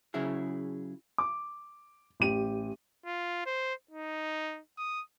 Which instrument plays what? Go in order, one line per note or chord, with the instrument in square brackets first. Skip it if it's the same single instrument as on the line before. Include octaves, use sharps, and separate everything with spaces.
[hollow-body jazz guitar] C#3 F#3 E4 G#4
[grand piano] D6
A1 G4 D#7
[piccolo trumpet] F4
C5
D#4
D#6